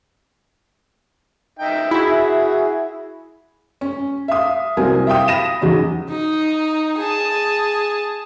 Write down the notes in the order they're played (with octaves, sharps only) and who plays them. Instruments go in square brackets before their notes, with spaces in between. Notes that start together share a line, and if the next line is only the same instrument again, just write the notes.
[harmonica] D#4 E5 G5
[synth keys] E4 [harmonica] F#4 G#4
[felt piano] C#4
E5 F5 D#6
C2 F#3 C4 A#4 G#5
E5 F5 G5 D#6
F5 B5 A#6 D#7 E7
E2 C#3 F#3 C#4 D#4
[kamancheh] D#4
G#4 A5